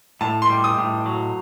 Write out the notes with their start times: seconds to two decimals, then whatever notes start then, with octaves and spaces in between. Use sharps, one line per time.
0.21 A2 A5
0.42 C6
0.50 G3
0.64 D#6
0.78 A2
1.06 F#3